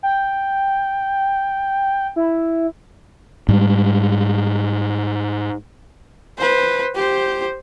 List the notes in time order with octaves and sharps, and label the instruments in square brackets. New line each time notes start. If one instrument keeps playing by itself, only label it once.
[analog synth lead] G5
E4
[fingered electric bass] G#2 G3
[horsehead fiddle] B4 C5
G4 C5